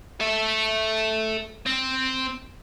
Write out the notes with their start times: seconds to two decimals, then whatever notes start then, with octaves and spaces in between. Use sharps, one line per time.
0.21 A4 E5
1.66 C4